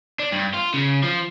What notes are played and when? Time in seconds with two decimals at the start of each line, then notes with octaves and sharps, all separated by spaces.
0.19 D4
0.32 G2
0.54 F4
0.74 C#3
1.04 F3